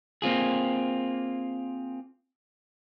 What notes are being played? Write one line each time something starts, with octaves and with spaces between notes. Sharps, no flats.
A#3 C4 F4 G#4